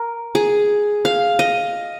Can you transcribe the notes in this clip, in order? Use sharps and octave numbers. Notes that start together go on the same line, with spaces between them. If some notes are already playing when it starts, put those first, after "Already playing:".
Already playing: A#4
G#4
F5
D#5